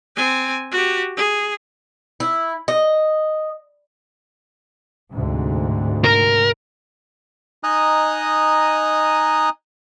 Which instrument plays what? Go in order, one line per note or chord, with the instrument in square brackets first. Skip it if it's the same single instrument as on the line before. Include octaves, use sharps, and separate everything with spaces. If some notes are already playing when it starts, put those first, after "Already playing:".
[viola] C4 G#5
F#4 G4
G#4
[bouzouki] E4
D#5
[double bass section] D2 G#2 C3
[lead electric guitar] A#4
[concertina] D#4 D#5 G#5 A#5 D#6 F#6